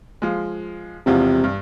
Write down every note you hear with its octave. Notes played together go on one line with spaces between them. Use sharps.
F3 G#3
E1 E2 C3 F3
G2